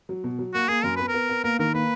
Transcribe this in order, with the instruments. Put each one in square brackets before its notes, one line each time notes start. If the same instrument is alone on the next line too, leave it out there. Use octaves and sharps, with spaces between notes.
[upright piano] F#3
B2
F#3
[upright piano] A#3 [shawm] F#4
[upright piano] A#3 [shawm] G#4
[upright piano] F#2 [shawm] A#4
[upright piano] B3 [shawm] B4
[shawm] A#4
[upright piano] B3
B3
[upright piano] A#3 [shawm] A#4
[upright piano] D#3 [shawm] A#4
[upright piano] A#3 [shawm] B4